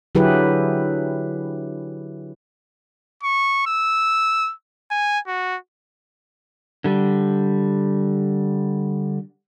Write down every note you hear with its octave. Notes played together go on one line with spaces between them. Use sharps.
D3 F#3 E4 G4 G#4 B4
C#6
E6
G#5
F#4
D3 G3